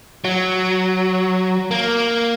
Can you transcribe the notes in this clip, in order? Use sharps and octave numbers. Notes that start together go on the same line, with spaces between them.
F#3
A#3